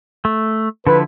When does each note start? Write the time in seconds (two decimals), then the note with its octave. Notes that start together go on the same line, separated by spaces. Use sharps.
0.25 A3
0.87 D3 F3 E4 B4